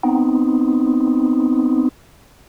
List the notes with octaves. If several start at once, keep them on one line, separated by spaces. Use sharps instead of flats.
B3 C4 D#4